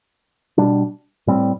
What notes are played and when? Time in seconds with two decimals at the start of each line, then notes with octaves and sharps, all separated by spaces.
0.58 B2 G3 D4
1.27 A2 G3 C4